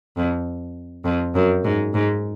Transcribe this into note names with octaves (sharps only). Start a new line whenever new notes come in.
F2
F2
F#2
G#2
G#2